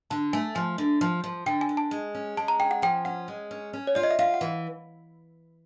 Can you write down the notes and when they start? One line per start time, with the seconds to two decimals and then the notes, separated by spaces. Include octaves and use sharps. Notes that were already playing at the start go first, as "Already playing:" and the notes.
0.10 D3 A5
0.33 A3 G#5
0.55 F3 G#5
0.78 D3
1.01 F3
1.24 F3
1.46 D3 G5
1.61 G#5
1.69 D3
1.77 A5
1.91 G#3
2.15 C#4
2.37 G#3 A5
2.48 A#5
2.60 C#4 G5
2.71 F#5
2.82 F3 G5
3.05 C#4 F#5
3.28 G#3
3.51 C#4
3.73 C#4
3.87 C#5
3.95 F4 D5
4.03 D#5
4.11 E5
4.19 F4 F5
4.34 F#5
4.41 E3
4.48 F5